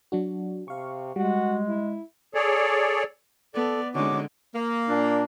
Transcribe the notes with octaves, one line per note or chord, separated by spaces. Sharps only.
F#3 D4 F#4
C3 F5 C#6
G3 G#3 F#4
E4
G#4 A4 C#5 D5
B3 A4 D5
D3 G#3 C#4 D#4 F#4 D6
A#3
A#2 D4